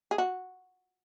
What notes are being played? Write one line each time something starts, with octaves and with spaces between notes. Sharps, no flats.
G#4
F#4